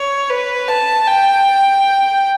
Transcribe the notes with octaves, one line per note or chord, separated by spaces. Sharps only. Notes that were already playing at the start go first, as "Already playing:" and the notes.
Already playing: C#5
B4
A5
G5